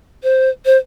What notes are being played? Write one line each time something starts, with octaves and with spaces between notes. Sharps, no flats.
C5
C5